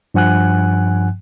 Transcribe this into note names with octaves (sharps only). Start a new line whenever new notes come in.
G2 F3 F#5 G#5 F#6